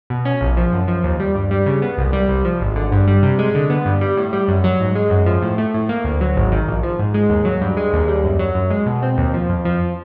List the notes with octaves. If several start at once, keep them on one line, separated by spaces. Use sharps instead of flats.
B2
C#4
A#1
F3
F#2
F3
D#2
G3
G2
G3
C#3
B3
C2
G3
C2
F3
G#1
D3
G2
G3
C3
G#3
D3
B3
G2
G3
A2
G3
F#2
F#3
G#2
G#3
F#2
F3
A2
A3
A2
A#3
D2
F#3
G#1
D#3
A#1
F3
G#2
G#3
D#2
F#3
G2
G#3
D#2
G3
F#2
F#3
F#2
G#3
B2
C4
D#2
F3
F2
F3